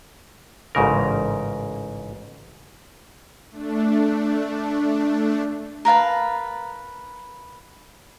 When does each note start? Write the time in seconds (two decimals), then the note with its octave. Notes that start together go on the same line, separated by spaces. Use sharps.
0.75 A1 G#2 C#3 A#4
3.51 A3 D4
5.85 A#4 B4 F5 A5